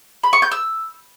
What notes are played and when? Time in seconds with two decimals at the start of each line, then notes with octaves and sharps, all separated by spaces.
0.23 B5
0.33 C#6
0.42 G6
0.52 E6